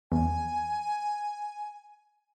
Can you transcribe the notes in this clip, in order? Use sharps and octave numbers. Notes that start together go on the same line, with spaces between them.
E2 G#5